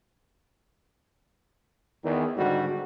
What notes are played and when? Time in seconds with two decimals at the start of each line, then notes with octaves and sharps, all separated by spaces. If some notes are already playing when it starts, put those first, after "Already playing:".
2.03 E2 D#3
2.36 G#2 D3 G3 F#4